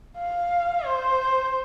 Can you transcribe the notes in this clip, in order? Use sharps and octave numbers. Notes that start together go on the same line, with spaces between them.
F5
C5